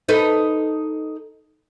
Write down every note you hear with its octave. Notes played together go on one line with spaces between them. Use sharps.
D#4 A4 B4